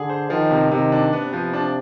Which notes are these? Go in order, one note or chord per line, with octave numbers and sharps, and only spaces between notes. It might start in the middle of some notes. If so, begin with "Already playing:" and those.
Already playing: D3 G#4
C5
D#3 F3
C3
C3 D#3
D4
C3 B3
F3
D4